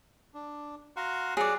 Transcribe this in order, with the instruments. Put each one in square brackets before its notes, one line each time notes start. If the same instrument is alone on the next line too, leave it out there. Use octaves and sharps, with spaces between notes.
[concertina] D4
[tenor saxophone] F#4 [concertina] F5 A#5 C6
[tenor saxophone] F#3 [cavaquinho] G#4 D5